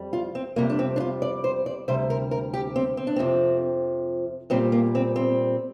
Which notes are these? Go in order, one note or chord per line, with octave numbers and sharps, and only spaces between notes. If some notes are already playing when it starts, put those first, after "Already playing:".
Already playing: F2 G3
F4
C4
F2 C3 G3 A#3
D4
C4
D4
F4
D5
C5
D5
D2 C3 G3 C5
A#4
A#4
G4
C4
C4
D4
F2 C3 F3 C4
A#2 G3 C4
A#3
C4
C4